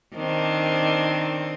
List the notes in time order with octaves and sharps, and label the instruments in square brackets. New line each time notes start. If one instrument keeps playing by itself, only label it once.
[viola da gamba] D#3 C4 D4